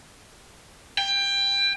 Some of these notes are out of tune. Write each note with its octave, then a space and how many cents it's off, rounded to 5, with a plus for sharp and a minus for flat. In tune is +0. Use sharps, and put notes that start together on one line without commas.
G5 +20